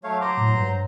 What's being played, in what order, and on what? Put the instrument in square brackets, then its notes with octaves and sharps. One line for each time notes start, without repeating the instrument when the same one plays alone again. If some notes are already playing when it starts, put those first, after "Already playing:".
[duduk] F#3 [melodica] A3 C#5 F5
[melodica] C5 A#5 C6 [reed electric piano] D6
[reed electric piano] A2
G2